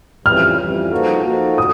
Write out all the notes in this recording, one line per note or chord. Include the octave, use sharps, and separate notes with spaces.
F2 C#3 E3 G3 F6
F2 C#3 E3 G3
F3 A#3 D#4 F#4 A4
F3 A#3 D#4 F#4 A4
D3 D#6